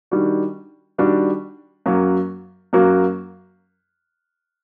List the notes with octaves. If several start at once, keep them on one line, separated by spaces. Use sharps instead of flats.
D#3 G3 D4 F#4
D#3 G3 D4 F#4
F#2 F#3 A#3 F#4
F#2 F#3 A#3 F#4